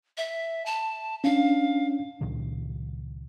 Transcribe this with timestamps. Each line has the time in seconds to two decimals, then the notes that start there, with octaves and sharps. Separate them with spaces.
0.17 E5
0.66 A5
1.24 C#4 D4 F5
2.21 C#2 A#2 D#3 F#3